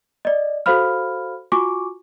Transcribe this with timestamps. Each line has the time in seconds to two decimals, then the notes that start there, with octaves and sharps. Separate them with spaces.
0.25 D5 D#5
0.66 F#4 A4 C5 F5 B5 F6
1.52 F4 F#4 G#5 C#6 D6